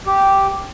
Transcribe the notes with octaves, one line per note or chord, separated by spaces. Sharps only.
G4